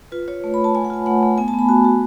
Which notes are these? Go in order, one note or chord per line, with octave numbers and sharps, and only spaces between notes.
F4 B4
F4 C#5
A3
B5
A3
A5
A3 G#5
F#5
F4 G#5
A3 F#5
A3
B3 G#5
A5
B3
B5
F#4 A5
F#4